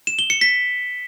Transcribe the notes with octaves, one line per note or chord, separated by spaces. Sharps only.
E7
G7
C#7
B6